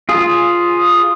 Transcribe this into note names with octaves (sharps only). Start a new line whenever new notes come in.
F4 G#4